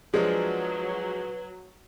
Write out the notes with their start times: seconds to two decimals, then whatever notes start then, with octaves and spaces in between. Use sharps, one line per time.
0.14 F3 F#3 G#3 D4 G#4 B4